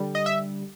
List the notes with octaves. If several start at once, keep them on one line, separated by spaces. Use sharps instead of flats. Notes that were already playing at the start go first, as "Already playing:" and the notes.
Already playing: D3 G3
D#5
E5